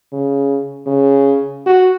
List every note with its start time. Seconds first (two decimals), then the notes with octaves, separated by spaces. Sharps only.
0.12 C#3
0.87 C#3
1.66 F#4